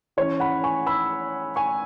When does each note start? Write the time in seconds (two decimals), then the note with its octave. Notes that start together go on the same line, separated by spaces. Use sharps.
0.17 E3 C#4 C#5
0.40 F#5 B5
0.64 G#5 C#6
0.87 B5 E6
1.56 G#5 C#6